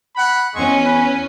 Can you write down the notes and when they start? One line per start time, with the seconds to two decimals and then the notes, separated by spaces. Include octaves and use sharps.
0.16 F#5 B5
0.54 E2 G#3 C4 C#4 C#6
0.84 B4